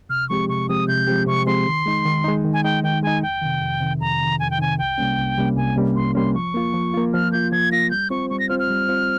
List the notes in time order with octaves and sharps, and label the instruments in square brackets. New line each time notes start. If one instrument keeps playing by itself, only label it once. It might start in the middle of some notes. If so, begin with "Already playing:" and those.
[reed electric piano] C3 [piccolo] F6
[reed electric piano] F3 G#3 C4 G4 [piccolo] C#6
[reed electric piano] C3 [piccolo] C#6
[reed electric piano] F3 G#3 C4 G4 [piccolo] D#6
[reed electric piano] C3 [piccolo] G6
[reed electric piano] F3 G#3 C4 G4
[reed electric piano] C3 [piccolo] C#6
[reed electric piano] F3 G#3 C4 G4 [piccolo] C6
[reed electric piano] D#3
G#3 D#4
D#3
G#3 D#4
D#3
[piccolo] G#5
[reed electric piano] G#3 D#4 [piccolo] G5
[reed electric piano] D#3 [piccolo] G5
[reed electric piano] G#3 D#4 [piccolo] G#5
[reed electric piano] F2 [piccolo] G5
[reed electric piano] C3 D#3
F2
C3 D#3
[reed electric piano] F2 [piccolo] A#5
[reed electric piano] C3 D#3
[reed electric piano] F2 [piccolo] G#5
[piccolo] G5
[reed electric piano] C3 D#3 [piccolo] G#5
[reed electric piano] C2 [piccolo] G5
[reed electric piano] C3 G3 A#3 C#4
C2
C3 G3 A#3 C#4
[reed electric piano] C2 [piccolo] G#5
[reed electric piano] C3 G3 A#3 C#4
[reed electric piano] C2 [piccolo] C6
[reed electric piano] C3 G3 A#3 C#4 [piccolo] C6
[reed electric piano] F3 [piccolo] C#6
[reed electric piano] A#3 F4
F3
A#3 F4
[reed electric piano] F3 [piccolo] F6
[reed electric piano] A#3 F4 [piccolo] G6
[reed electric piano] F3 [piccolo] G#6
[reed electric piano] A#3 F4 [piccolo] A#6
[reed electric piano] G3 [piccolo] G6
[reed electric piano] C4 F4 C5 [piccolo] C#6
[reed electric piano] G3 [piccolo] C#6
[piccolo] A#6
[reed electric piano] C4 F4 C5 [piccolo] F6
[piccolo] F6
[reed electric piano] G3
C4 F4 C5